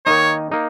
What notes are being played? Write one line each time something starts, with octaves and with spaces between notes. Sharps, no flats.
D#3 A#3 D#4 C#5
A#3 D#4